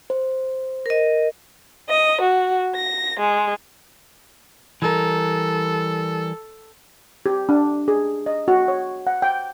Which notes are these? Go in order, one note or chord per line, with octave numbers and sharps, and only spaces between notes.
C5
A#4 D#5
D#5
F#4
A#6
G#3
E3 G3 A4 A#4
G4
D4
G#4
D#5
F#4
C#5
F#5
G5